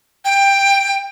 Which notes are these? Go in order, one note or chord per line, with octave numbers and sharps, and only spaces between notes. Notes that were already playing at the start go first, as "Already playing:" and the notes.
G5